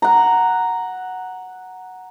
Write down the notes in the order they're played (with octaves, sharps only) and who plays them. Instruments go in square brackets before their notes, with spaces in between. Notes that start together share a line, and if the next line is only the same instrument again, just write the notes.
[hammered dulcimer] F#5 A#5